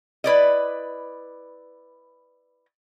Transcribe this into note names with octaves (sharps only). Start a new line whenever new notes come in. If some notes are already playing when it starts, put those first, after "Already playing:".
E4 B4 D5 D#5